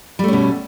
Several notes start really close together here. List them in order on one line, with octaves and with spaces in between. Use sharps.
G3 A3 C#4 B2